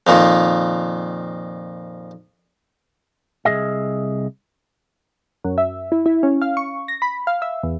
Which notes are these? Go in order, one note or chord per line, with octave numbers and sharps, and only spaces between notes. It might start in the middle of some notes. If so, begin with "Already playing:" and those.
F2 A#2 D#3
C2 F3 G#4 D#5 E5
F#2
E5
E4
E4
C#4
F5
C#6
A#6
B5
F5
E5
E2